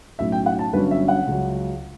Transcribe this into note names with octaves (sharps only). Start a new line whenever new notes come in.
B1 A2 F#3 C#4 E5
G5
F#5
A5
G1 G2 D3 F#3 C#4 B4
E5
F#5
C#2 C#3 F#3